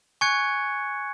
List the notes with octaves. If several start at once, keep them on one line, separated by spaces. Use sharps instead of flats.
G#5 C#6 F#6 G#6 C#7